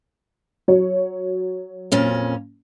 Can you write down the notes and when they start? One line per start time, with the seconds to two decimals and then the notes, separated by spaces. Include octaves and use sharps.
0.68 F#3 C#5
1.92 F2 A#2 C#4